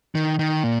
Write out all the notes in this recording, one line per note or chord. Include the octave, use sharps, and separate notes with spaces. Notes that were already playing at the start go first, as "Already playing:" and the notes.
D#3
D#3
A#2